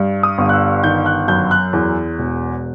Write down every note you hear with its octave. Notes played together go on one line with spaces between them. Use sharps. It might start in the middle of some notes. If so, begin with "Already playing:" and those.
Already playing: G2
D#6
G1
F#6
E6
D#3 G6
F#6
F#2 G6
F#6
E2
E1